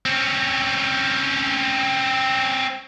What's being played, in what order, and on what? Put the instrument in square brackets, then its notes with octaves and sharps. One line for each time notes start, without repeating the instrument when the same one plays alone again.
[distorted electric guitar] C4 C#4